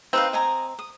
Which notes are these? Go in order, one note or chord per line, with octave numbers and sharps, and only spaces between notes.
C4 D#4 B4 F5
D#5 G#5 A#5
D#6